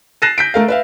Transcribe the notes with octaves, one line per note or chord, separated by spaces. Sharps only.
F#6 A6 A#6 C7 D#7 E7
G6 B6 D7
A3 A#4 F5
B4 E5 F5